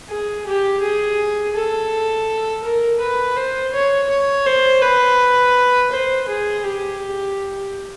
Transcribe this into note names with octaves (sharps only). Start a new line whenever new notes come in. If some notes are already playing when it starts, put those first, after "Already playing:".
G#4
G4
G#4
A4
A#4
B4
C5
C#5
C#5
C5
B4
C5
G#4
G4